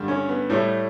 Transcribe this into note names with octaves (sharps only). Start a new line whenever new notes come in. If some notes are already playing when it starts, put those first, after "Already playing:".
Already playing: G2 D3 G3
C#4
B3
A2 G3 A3